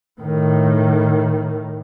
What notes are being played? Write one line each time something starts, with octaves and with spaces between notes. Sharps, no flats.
A2 D#3